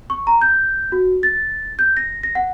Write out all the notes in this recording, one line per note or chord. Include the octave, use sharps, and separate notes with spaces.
C#6
A#5
G6
F#4
A6
G6
A#6
A#6
F#5